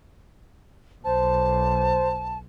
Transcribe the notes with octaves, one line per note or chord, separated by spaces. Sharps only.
B1 C5 A5